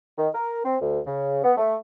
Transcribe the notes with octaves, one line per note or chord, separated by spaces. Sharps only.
D#3
A#4
C4
D2
C#3
B3
A3